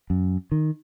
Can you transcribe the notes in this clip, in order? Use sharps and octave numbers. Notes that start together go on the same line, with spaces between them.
F#2
D#3